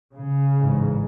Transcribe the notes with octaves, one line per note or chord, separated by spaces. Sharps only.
C#3
A1 G#2